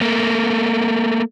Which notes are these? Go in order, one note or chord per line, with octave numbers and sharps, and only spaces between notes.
A3 A#3